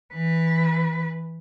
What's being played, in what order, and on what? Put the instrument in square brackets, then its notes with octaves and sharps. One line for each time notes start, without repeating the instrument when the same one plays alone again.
[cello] E3 B4